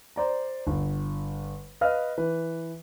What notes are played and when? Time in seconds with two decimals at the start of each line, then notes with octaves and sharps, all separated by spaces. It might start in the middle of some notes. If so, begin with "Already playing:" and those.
0.16 C5 D5 A#5
0.67 G1
1.81 B4 D#5 F5 F6
2.18 E3 B4